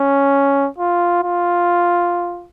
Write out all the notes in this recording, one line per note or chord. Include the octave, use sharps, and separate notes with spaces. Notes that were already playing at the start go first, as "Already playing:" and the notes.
Already playing: C#4
F4
F4